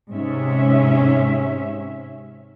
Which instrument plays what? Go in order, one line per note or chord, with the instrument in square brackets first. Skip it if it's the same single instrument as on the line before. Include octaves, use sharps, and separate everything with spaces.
[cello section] G#2 C3 C#4 E5